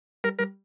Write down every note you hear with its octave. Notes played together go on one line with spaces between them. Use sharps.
G3 A#4
G3 A#4